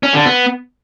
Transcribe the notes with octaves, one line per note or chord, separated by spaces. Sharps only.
C#4
D3
B3